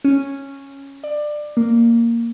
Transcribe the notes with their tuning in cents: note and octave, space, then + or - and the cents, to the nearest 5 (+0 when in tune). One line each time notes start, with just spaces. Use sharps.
C#4 -5
D5 +20
A#3 -5